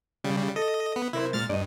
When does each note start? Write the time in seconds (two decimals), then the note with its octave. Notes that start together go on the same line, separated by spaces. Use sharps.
0.24 C#3 G3
0.56 A4 D#5
0.96 B3
1.13 C3 E4 A#4 C5
1.33 A#2 G#3 F6 A6
1.49 G2 D5 D#5